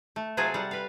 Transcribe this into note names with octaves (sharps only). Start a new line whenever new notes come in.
A3
C3 F#3 F4 G#4 A4
G3 F#5
B4 F5